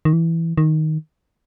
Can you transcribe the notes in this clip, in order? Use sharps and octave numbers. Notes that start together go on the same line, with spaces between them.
D#3
E3
D#3